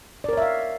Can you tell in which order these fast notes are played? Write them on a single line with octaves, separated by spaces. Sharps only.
D5 A#4 C#5 E5 F5